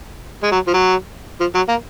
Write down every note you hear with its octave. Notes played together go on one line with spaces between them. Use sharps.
G#3
F#3
F3
F#3
F3
F#3
A#3